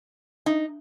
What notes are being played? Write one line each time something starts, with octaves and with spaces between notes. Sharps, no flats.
D#4